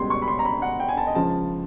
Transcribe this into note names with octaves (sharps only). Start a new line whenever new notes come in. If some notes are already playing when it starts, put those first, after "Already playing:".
Already playing: C#2 B2 G3 C6
C#6
B5
C6
A#5
B5
F#5
G5
G#5
A5
D#5
C#2 C#3 F3 A5